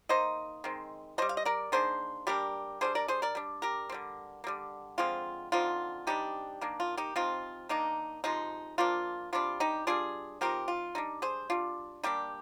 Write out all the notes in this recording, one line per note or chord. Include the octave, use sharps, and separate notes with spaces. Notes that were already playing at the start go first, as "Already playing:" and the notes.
D#3 A#3 D#4 C5 D#5
D#3 G#3 C4
G3 D4 C5 D#5
F5
D#5
A#4 D5
D#3 A#3 D4 G#4 C5
G3 A#3 D4 G4 A#4
G3 A#3 D4 G#4 C5
A#4 D5
G#4 C5
A#4 D5
G3 D4
G4 A#4
C4
D3 G3
A#3
D3 G3
D3 F3 G#3 C4 F4
D3 F3 C4 D#4 F4
C3 G3 D4 D#4 G4
D#3 A#3 D4
F4
D#4 G4
C3 F3 C4 D#4 F4
D#3 A#3 D4 D#4
C3 F3 G#3 D#4
F3 A#3 D4 F4
C3 G3 D4 F4
D#4 G4
G3 D4 F4 G#4
F3 C4 D#4 G4 A#4
F4
G3 D4 D#4
G#4 C5
G3 D4 F4
G3 A#3 D4 D#4 G4